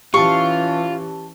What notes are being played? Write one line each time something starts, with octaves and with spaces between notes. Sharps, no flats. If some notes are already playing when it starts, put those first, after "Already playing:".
E3 C#4 F4 G4 A5 C#6